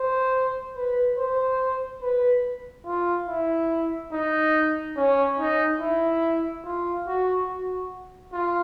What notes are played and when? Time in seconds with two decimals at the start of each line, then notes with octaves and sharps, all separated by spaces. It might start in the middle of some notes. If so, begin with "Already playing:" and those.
Already playing: C5
0.76 B4
1.17 C5
2.02 B4
2.86 F4
3.28 E4
4.12 D#4
4.96 C#4
5.39 D#4
5.80 E4
6.64 F4
7.07 F#4
7.48 F#4
8.33 F4